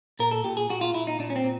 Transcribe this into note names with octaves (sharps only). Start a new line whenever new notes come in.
A#2 A#4
A4
A#2 G4
G#4
A#2 F#4
F4
A#2 E4
D#4
A#2 D4
C#4
C4
A#2